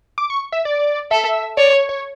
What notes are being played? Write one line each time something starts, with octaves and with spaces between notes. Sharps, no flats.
D6
C#6
E5
D5
A4 E5
C#5 D5
C#5
C#5